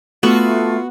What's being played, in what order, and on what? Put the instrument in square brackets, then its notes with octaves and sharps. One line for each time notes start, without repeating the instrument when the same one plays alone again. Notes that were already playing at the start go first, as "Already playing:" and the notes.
[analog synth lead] A3 [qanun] B3 [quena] F4 [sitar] F#4